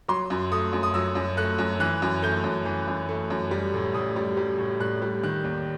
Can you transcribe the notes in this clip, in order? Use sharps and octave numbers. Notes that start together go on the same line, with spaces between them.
F#3 C6
F#2
A3 D#6
F#2
D#6
F#3 E6
F#2
A3 F#6
F#2
E3 F#6
F#2
A3 G6
F#2
E3
F#2
A3
F#2
G3
A2
A2 D#6
G3
G3
A2
A2 F#6
G3
D#3 F#6
D#2